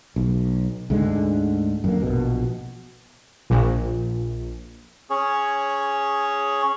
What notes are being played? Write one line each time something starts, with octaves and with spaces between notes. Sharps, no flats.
B1
D2 G#2 D3 G#3
F#2 D3 A#3
A#1 B2
A#1
C#4 G#4 C#5